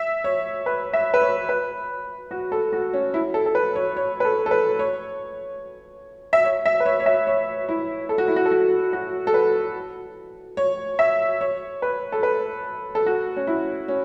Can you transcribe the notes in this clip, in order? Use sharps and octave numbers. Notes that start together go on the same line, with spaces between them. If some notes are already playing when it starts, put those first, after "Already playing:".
Already playing: E5
C#5
B4
E5
B4
C#5
B4
F#4
A4
F#4
C#4
E4
A4
A4
B4
C#5
C#5
B4
A4
A4
B4
C#5
E5
C#5
E5
B4
C#5
C#5
E5
C#5
E4
A4
F#4
E4
F#4
A4
F#4
F#4
A4
B4
C#5
E5
C#5
B4
A4
B4
A4
F#4
C#4
E4
C#4